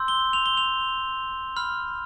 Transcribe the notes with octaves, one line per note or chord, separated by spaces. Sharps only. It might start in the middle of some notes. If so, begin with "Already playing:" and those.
Already playing: C6 E6 G6
G7
F7
G7
F7
B5 F6